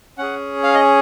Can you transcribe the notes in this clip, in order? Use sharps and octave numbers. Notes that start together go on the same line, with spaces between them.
C#4 G#4 F#5
F5
D#5